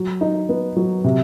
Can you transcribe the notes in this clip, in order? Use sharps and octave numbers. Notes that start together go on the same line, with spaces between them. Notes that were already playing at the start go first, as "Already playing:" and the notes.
Already playing: F#3
D#4
B3
F#3
C3